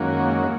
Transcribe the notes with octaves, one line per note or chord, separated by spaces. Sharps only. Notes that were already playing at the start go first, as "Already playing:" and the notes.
Already playing: F#2 D#3 G#3 A#3 C#4 F#4